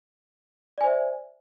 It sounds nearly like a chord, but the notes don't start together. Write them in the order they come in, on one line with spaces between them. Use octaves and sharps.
D5 G#5 C5 E5